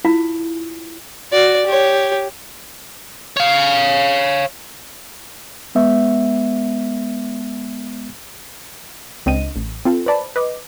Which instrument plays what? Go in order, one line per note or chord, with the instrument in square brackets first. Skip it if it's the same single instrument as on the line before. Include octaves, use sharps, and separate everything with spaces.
[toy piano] E4 F4 F5
[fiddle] F#4 D5
G4 C#5
[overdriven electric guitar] C#5 F5
[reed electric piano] G#3 B3 E5
[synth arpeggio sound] C#2 C4 D4 D#5 D#7
A1
C4 F4 A4
B4 C5 D5 A5 B5
B4 D#5 D6